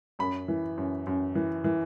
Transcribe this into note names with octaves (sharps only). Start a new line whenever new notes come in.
F#2 B5
E3
F#2
F#2
E3
E3